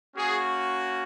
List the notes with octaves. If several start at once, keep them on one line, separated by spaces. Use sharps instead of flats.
A#3 C#4 F#4 G#4